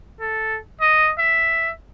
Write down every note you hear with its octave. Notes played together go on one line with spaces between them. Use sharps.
A4
D#5
E5